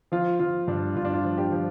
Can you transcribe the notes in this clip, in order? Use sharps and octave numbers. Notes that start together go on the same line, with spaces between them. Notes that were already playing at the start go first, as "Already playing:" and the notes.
F3 F4
F3 F4
G2 D4
G2 F4
D4
F4
F3
D4 G4
F3